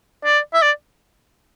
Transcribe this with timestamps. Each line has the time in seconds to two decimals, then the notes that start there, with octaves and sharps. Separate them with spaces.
0.25 D5
0.54 E5
0.62 D5